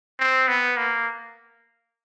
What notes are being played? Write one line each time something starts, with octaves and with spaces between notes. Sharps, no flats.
C4
B3
A#3